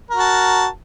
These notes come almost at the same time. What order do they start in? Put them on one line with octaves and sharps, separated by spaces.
A#4 F#4 A5